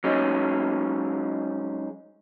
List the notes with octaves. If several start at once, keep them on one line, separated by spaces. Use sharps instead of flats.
F#3 G#3 C#4 D#4